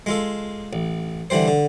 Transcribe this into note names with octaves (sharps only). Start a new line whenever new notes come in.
G#3 F4 A4
A1
D3 E3 G3 C5
D3